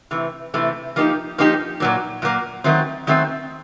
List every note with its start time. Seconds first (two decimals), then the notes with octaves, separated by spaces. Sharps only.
0.11 C3 E3 A3
0.54 C3 E3 A3
0.96 F3 A#3 D#4 G4
1.38 F3 A#3 D#4 G4
1.80 A#2 F#3 A#3
2.22 A#2 F#3 A#3
2.64 D#3 F#3 A3 C4
3.07 D#3 F#3 A3 C4